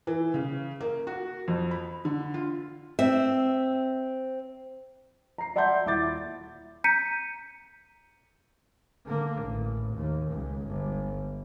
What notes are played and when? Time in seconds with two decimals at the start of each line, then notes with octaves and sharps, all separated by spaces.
0.07 E3
0.34 C#3
0.81 A#3
1.07 F#4
1.48 F2
1.71 B5
2.05 D3
2.34 F4
2.99 C4 E5
5.38 A#5 C7
5.56 D5 E5 F#5 A5 C6 G6
5.86 D#1 E4 D6 A6
6.84 A#5 G6 B6 C#7 D#7
9.06 D3 A#3
9.42 A1
9.95 D#2
10.32 C#2
10.67 G1